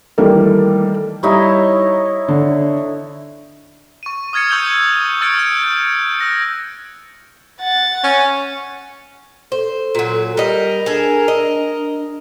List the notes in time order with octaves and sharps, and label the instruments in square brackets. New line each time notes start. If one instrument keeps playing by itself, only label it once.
[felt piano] D#3 E3 G3 A3 A#3 A4
[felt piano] G3 [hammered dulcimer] D#4 E4 C#5
[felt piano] D3
[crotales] C#6 D#7
D#6 F6 G#6 A6 C#7
C#6 E6 G6 C#7 F7 G7
C#6 E6 F6 A6 C#7 D7
E6 G6
E6 F#6 A#6 D7
[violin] F#5 A6
[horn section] C#4
[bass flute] A4 [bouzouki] C5
[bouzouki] A#2 F#3
[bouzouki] G3 D#5 [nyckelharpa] A#4
[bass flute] D4 [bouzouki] G#4 A4
[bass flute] D4 [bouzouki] D#5
[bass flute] D4